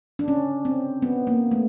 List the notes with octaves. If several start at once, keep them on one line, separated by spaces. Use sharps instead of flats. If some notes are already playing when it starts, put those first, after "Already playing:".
D4
C#4
C4
B3
A#3
A3